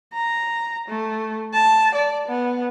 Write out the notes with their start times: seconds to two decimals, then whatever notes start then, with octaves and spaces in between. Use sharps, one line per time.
0.13 A#5
0.88 A3
1.53 A5
1.94 D5
2.27 B3